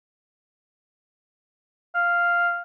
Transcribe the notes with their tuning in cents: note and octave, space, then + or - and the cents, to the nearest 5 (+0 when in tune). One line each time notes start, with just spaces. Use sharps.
F5 -5